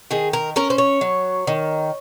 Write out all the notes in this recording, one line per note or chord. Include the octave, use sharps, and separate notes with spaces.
D#3 G#4
A#4
C#4 A#4
C5
C#5
F#3
D#3